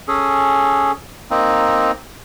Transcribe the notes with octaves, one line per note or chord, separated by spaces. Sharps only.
C#4 G#4 A4
A#3 C4 D#4